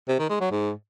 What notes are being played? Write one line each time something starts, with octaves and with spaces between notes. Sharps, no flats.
C3
D#3
G#3
F#3
G#2